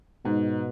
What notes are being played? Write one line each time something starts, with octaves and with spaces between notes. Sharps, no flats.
G#2 B2